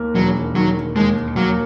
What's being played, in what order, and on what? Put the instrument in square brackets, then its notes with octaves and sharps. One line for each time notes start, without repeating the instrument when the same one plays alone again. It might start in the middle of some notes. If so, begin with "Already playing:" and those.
Already playing: [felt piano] D#2 A#3
[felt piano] E1 [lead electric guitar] F#3
[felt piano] D#3 [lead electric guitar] F#3
[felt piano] D#2 [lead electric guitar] G#3
[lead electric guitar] F#3 [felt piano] A#3